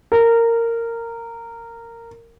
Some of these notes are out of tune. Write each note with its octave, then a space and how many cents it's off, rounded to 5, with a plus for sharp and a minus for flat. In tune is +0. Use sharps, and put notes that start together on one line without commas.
A#4 -15